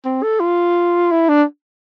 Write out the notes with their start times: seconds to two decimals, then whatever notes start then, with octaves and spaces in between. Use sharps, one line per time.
0.05 C4
0.23 A4
0.40 F4
1.11 E4
1.29 D4